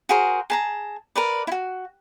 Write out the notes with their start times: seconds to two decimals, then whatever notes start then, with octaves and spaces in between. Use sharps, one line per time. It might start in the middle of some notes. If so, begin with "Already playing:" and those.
0.09 F#4 G#4 A#4 C5
0.50 G#4 A5 A#5
1.16 A#4 B4 D5
1.47 E4 F#4